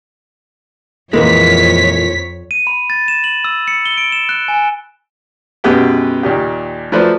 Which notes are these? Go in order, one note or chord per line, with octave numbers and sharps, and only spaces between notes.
F2 A#2 E3 G#3 A#3 C#5 B6
D#7
B5
A6
E7
F#7
E6
C#7
G7
D7
E7
F#6
G#5
F#2 B2 G#3 G4 B4
D#2 A#2 G4
F3 F#3 A3 B4 C5 D5